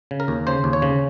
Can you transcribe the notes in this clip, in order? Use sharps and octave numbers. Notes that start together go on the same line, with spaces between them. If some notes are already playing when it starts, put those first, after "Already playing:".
C#3
A#4
D#2
C#3 C5
D#2
C#5
C#3